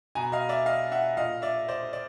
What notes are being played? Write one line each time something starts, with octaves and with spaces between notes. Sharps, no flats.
B2 G#5 A#5
D#5 F5
D5 E5
D#5 F5
E5 F#5
A#2 D#5 F5
D5 E5
C5 D5
D5